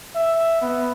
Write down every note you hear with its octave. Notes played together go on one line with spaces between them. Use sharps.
E5
B3